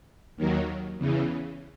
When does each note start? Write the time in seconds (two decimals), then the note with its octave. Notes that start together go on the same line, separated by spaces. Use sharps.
0.37 D#2 D#3 F#3
0.98 E2 C#3 E3